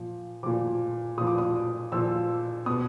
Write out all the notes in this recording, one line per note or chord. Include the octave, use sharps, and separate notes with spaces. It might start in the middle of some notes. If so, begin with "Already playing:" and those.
Already playing: A#2 F3
A#2 F3 D6
A#2 F3 D#6
D6
D#6
A#2 F3 E6
B2 D#6